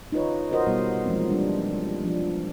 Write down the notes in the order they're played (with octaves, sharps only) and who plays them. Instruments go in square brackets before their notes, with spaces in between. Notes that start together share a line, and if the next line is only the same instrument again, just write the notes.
[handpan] D#4 F4 B4 C#5
F#4 A#4 C5 D#5
B2 G3 B3
E3 F3 G#3 A#3 C4
G3 D4
F3 D4